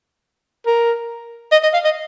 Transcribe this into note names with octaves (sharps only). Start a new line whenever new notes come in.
A#4
D#5
D#5
F5
D#5